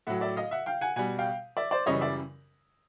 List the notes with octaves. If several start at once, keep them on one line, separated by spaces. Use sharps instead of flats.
A2 F#3 E5 F#5
D5 E5
D#5 F5
E5 F#5
F5 G5
F#5 G#5
B2 G3 F#5 G#5
F5 G5
D5 E5
C5 D5
F#2 C#3 E3 G3 C#5 D#5
D5 E5